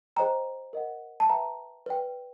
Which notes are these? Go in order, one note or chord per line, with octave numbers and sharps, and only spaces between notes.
G#4 C5 D#5 G5 A#5
A#4 D#5 F#5
A5
B4 E5 G5 A#5
B4 D5 G5